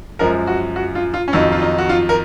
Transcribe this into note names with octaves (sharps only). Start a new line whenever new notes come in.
F#2 F3 G#3 A#4
F#4
F#4
F4
F4
C#4
F2 D#3 F#3 D#4
F4
D#4
F#4
F4
A#4